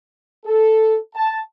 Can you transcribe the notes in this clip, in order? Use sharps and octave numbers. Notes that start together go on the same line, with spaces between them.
A4
A5